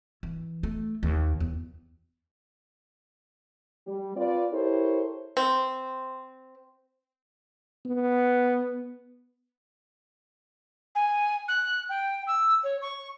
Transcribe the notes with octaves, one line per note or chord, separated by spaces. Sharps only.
E3
A3
D#2
E2
G3
C4 F4 B4 D5
E4 G4 A4 A#4 C5 C#5
C4
B3
G#5
F#6
G5
E6
C#5
C#6